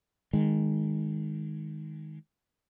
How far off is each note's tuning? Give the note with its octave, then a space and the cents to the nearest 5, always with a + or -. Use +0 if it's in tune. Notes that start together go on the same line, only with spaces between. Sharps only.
D#3 +0 G#3 +0